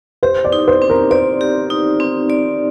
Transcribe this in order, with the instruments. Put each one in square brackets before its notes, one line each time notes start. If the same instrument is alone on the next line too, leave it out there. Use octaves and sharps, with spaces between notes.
[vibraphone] G4 [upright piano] C5
[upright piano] D5
[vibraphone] D#4
[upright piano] C5
[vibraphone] C4
[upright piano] A#4
[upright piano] C5 [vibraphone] D5
[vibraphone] G4
D#4
C4
D5